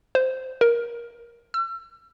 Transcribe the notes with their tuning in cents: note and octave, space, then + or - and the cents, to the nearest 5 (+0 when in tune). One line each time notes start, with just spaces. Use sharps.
C5 -10
A#4 +20
E6 +40